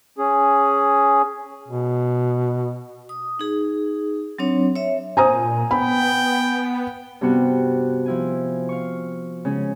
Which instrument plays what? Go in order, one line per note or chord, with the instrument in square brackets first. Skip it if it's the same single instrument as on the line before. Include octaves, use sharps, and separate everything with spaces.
[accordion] C#4 G#4
[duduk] B2
[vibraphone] D#6
D#4 G#4
F#3 C4 D4 C#5
C#5 E5
[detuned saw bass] A#2 [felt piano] C5 A#5 D#6 [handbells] G#5
[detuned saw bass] B3 [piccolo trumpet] G5 [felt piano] B5
[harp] G2 C3 B3 F#4
F3 E4 G#5
F5 C#6
C#3 G#3 C#4